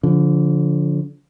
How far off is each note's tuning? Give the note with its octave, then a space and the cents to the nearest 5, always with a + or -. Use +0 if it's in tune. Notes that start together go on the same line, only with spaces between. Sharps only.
D3 -30 F3 +0